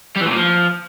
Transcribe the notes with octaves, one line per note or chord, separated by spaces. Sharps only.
G3
E3
A2
A#2
F3